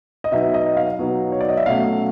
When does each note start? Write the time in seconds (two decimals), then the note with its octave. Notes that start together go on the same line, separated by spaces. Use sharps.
0.24 D#5
0.32 B2 F#3 B3 D#4 E5
0.54 D#5
0.77 F5
0.99 B2 F#3 B3 D#4
1.32 C#5
1.41 D5
1.49 D#5
1.57 E5
1.66 B2 F#3 A3 C#4 F5